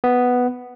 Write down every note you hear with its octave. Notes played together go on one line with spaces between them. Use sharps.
B3